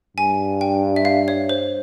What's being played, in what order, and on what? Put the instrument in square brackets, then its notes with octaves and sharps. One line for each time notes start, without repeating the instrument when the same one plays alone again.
[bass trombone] G2 [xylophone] G#5
[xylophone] G5
E5
F5
C#5
C5